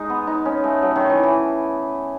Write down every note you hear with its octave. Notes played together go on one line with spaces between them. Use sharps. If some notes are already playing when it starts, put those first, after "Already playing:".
Already playing: G#3 D#4
B3
D#4
C#4
A3
F#3
D#3
E3
E3